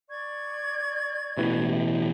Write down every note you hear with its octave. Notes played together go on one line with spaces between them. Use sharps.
D5 C#6 G#6
A1 B2 E3